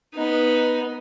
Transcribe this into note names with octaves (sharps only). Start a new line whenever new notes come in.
B3 D#4